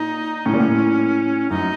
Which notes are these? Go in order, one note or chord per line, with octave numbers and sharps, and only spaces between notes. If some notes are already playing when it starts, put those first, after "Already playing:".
Already playing: A#2 D#4
A2 C#4
A#2
A2
F#2 D#4